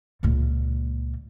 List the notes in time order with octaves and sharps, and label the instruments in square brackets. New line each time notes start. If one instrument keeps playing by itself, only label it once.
[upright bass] C#2 A#2